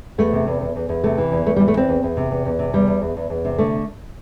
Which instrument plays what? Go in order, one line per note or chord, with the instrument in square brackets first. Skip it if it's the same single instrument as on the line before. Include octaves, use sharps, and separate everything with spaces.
[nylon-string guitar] E2 A3
C3
E2
E2
E2
E2
C3 A3
E3
E2
E2 A3
G3
E3
A3
E2 C4
E2
E2
C3
E2
E2
C3
E2 G3
E2
E2
E2
E2
C3
D3 A3